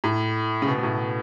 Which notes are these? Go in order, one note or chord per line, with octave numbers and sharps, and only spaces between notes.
A2
C#3
B2
B2
A2